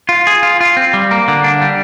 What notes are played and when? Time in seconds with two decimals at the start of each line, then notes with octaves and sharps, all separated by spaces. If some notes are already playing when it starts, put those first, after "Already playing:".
0.09 F4
0.27 G#4
0.43 F4
0.61 F4
0.77 C4
0.94 G3
1.11 A#3
1.28 D3
1.44 D4
1.61 G3